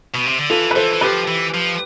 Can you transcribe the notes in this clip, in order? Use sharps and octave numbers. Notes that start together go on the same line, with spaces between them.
B2
C3
D3
E3 F4 A4
B4
E3 A4 C5
E3
F3 G4 B4
E3
F3